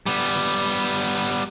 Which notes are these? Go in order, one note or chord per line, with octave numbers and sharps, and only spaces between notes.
G3 B3